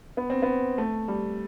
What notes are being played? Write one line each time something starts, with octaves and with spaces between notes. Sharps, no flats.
B3
C4
B3
A3
G3